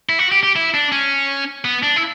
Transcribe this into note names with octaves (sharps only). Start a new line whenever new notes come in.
E4
F#4
G4
G4
E4
D4
C#4
B3
D4
E4